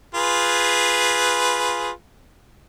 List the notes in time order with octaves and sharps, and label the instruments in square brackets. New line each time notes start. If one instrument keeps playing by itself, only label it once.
[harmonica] F4 G#4 B4